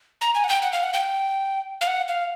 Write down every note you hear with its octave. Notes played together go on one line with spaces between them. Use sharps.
A#5
G#5
F#5
G5
F#5
F5
F#5
G5
F5
F#5
F5